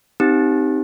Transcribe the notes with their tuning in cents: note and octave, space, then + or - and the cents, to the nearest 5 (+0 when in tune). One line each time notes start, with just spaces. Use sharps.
C4 +0 D#4 +0 G4 +0